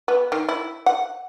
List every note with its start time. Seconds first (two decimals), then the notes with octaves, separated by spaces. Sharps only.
0.08 B3
0.32 D#3
0.49 E4
0.86 F#5